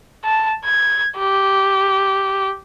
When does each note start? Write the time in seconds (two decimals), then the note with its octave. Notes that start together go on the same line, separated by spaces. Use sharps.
0.24 A5
0.65 G#6
1.18 G4